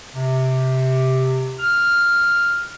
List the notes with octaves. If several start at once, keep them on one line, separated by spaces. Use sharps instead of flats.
C3
F6